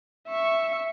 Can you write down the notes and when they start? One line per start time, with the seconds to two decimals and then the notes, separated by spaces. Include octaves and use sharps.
0.28 E5 C#6